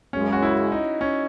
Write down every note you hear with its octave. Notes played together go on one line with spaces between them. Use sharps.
F#2 C#3 G#3 C#4
F#4
E4
D#4
C#4